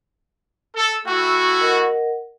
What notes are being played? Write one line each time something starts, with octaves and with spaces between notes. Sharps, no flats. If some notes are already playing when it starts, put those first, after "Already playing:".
A4
A3 E4 F#4 G5 C#6
A#4 D#5 F#5